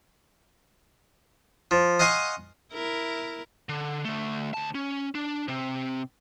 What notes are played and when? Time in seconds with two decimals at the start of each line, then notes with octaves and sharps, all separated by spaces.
1.71 F3
1.99 D#5 F5 F#5 G#5 C6 C#6
2.73 E4 A#4
3.69 D3
4.05 D3 A3
4.54 D2 A5
4.75 C#4
5.15 D4
5.48 C3 C4